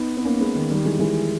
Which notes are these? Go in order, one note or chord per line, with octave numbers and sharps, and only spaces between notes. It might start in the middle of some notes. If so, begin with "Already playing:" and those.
Already playing: B3 D#4
B3
A#3 C#4
G#3 B3
D#3
D#3 G3
E3 G#3
E3 G#3